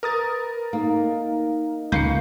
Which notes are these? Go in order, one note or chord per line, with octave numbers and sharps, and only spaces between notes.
A#4 B4 D#6 A6
A#3 D#4
C#2 A#3 G6 C7 C#7